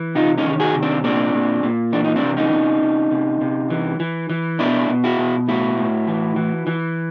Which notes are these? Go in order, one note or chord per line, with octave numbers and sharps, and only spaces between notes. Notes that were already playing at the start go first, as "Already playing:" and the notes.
Already playing: E3
C3 D#4 F4
C#4 D#4
D#3
F#4 G#4
C3
C4 D4
A#2 C4 D4
A#2
A#2
E3 D4
D#4
C4 D4
C3
C#4 D#4
C3
C3
C3
C3
E3
E3
E3
B2 D4 E4
B2
E4 F#4
B2
A2 E4 F#4
A2
E3
E3
E3